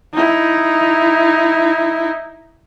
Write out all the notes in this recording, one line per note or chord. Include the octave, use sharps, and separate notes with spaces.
D#4 E4